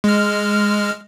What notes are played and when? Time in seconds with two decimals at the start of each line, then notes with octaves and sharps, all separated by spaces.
0.04 G#3 F6